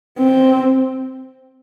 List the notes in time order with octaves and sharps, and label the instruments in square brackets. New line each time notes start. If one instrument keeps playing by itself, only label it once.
[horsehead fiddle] C4